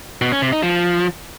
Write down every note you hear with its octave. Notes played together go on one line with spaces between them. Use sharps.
B2
C#4
C3
D#4
F3